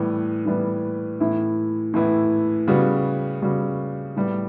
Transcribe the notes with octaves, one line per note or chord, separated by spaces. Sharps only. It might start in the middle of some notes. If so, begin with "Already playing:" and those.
Already playing: A2 E3 G3 B3
A2 E3 G3 B3
A2 E3 B3 E4
A2 E3 B3 E4
C#3 G3 B3 F#4
C#3 G3 B3 F#4
A2 G3 B3